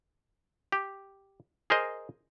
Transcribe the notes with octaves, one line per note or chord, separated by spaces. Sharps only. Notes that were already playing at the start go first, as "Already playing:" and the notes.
G4
G#4 A#4 C5 D#5